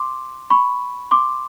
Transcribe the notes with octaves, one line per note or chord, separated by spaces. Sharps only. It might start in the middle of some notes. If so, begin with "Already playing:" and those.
Already playing: C6 D6
B5 C#6
C6 D6